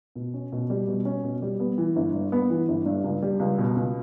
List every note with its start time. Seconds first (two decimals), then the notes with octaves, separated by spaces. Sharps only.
0.15 B2
0.34 C#4
0.52 B2
0.70 G3
0.88 B2
1.05 C#4
1.24 B2
1.42 G3
1.60 B3
1.78 E3
1.96 G1
2.14 G2
2.32 B3
2.50 E3
2.68 G1
2.86 G2
3.04 C#2
3.22 G3
3.39 C#2
3.58 B2
3.76 C#2